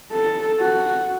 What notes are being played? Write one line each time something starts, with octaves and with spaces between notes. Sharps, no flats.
A4
F#4